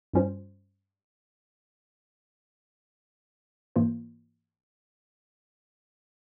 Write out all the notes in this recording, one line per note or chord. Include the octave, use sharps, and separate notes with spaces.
G2 G3 C#4 F4 C5
G#2 E3 A#3 F4 C5